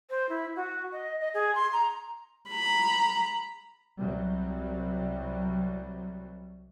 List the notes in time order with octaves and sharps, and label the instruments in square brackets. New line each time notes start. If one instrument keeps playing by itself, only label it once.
[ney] C5
E4
F#4
D#5
D#5
G#4
C6
A#5
[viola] A#5 B5
[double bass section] C2 C3 F#3 G3